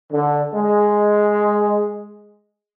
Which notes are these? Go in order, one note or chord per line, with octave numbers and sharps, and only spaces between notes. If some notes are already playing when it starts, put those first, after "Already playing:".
D3
G#3